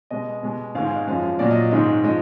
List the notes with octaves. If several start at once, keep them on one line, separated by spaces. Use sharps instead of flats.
B2 G#3 D#5
B2 G#3
G#2 D#3 G#3 F5
G#5
D#5
F#2 F3 G#3 F5
A#2 F#3 D5
D#5
G#2 D#3 G#3 D#5
F3 G#3 D#5